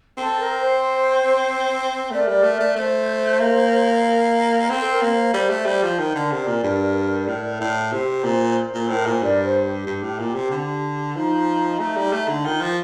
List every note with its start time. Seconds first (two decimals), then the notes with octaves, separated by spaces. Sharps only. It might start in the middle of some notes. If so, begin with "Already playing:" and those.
0.18 C4 A4
0.39 A#4
0.61 C5
2.11 A3 A#4 D5
2.28 G3
2.43 A3
2.60 A3
2.76 A3 C5
3.40 A#3
4.05 A#4
4.69 C4 A4
4.85 C5
4.91 A#4
5.02 A#3
5.13 C5
5.34 G3 C5
5.50 A3
5.66 G3
5.83 F3
5.99 D#3 A#4 D5
6.15 D3
6.32 C3
6.47 A#2
6.63 G2
7.28 A2
7.61 A2
7.92 C3 C5
8.24 A#2
8.74 A#2
8.81 A4
8.89 A2
8.94 A#4
9.06 A#2 C5
9.22 G2 A#4 D5
9.43 C5
9.65 G4
9.87 G2
10.03 A2
10.19 A#2
10.34 C3
10.51 D3
11.16 F3 D#4
11.79 A3
11.97 G3
12.13 A3
12.28 D3
12.45 D#3 F4
12.61 F3